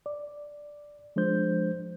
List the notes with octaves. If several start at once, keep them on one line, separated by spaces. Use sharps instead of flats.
D5
F3 G#3 D4 C5 G6